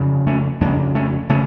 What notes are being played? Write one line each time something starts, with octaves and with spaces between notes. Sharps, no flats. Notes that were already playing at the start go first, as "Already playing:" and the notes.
Already playing: F2 C#3
A3 C#4
F2 C#3 A#3 D4
A3 C#4
C#3 A3 C#4